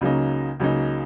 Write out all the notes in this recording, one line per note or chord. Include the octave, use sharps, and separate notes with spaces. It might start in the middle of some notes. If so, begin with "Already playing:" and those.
C#2 C#3 F#3 A#3 D#4
C#2 C#3 F#3 A#3 D#4